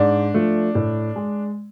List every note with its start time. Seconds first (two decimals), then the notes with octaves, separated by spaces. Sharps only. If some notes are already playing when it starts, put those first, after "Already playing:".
Already playing: G#2 D4
0.34 F3 A3
0.75 A2
1.16 G#3